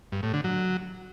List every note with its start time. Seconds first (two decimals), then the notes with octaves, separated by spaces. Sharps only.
0.12 G2
0.23 A2
0.33 D3
0.44 F#3